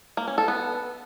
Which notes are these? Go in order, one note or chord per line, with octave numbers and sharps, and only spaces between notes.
A#3
C#4
A4
B3